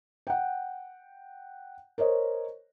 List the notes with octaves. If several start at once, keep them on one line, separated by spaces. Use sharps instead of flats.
F#5 G5
A#4 C5 C#5 D#5